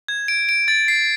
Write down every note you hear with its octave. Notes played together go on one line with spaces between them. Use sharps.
G#6
D7
D7
A6
C7